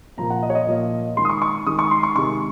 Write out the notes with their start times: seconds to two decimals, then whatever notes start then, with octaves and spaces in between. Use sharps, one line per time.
0.17 A#2 F3 A#3 A#5
0.30 F#5
0.43 D#5
0.50 C#5
0.55 D#5
0.67 A#2 F3 A#3
1.17 D#3 G#3 C6
1.25 D#6
1.30 C#6
1.42 C#6
1.66 D#3 G#3 D#6
1.79 C#6
1.91 C6
2.03 C#6
2.15 C3 D#3 G#3 C#6